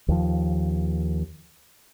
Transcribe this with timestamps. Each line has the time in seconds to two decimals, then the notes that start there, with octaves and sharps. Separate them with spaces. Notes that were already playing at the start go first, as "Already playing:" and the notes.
0.08 D#2 F3